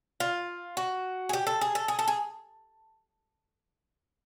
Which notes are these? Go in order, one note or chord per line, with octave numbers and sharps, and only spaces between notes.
F4
F#4
G#4
G4
A4
G#4
A4
G#4
A4
G#4